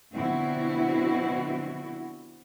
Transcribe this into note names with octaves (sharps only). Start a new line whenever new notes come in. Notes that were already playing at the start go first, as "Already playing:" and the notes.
B2 D3 F3 C4 E4 F#4